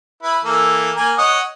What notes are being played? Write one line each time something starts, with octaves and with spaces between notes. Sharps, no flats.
E4 B4
E3 A#3 A4
A#3 A#4 G#5
C#5 D#5 F#5